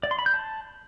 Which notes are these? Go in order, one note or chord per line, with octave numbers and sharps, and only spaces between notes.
D5
C6
B5
G6
A5